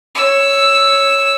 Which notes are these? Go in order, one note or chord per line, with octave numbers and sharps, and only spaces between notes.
C#5 E6